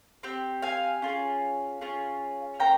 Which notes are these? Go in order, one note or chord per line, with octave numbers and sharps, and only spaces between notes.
C4 G4
F5 G#5
C#4 F4 G#4
C#4 F4 G#4
A#3 C#4 G5 A#5